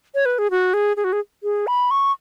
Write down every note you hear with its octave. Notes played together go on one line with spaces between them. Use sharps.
C#5
B4
G#4
F#4
G#4
G#4
F#4
G#4
G#4
B5
C#6